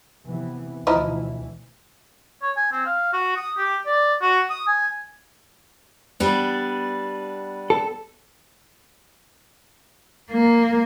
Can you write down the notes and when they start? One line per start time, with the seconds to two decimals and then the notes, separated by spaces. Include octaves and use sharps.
0.24 C3 E3 B3
0.87 D2 B2 E3 F3 D#4 E4
2.42 C#5
2.56 G#5
2.72 C4
2.86 F5
3.13 F#4
3.36 D#6
3.57 G4
3.86 D5
4.22 F#4
4.50 D#6
4.67 G#5
6.20 G3 B3 D4
7.70 A4
10.32 A#3